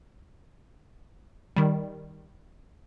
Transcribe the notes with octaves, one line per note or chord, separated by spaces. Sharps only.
D#3 G3